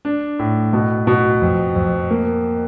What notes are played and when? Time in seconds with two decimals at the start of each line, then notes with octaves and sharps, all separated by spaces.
0.05 D4
0.39 A2
0.73 B2
1.07 B2
1.42 F2
1.76 F2
2.10 A#3